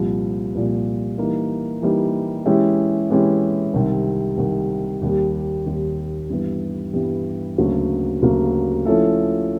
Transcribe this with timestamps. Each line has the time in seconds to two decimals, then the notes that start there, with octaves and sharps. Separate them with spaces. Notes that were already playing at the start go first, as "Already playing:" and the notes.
Already playing: C2 A#2 F3
0.55 C2 A#2 F3
1.18 E3 G3 A#3 D#4
1.82 E3 G3 A#3 D#4
2.46 E3 G#3 C#4 E4 G4
3.10 E3 G#3 C#4 E4 G4
3.74 C2 C3 D#3
4.38 C2 C3 D#3
5.01 D#2 D#3 G3
5.66 D#2 D#3 G3
6.30 G2 E3 G3 B3
6.93 G2 E3 G3 B3
7.58 D2 C#3 F#3 A#3
8.22 D2 C#3 F#3 A#3
8.85 F3 A3 C#4 E4 A4